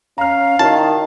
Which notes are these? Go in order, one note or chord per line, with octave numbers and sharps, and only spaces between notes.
C#4 F5 A#5 F6
D#3 E4 F#4 C#5 A5